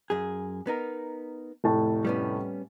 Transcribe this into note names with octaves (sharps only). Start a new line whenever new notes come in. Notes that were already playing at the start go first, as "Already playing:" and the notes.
F#2 G#4
B3 D#4 A#4
F1 A2 A5
G3 B3 C#4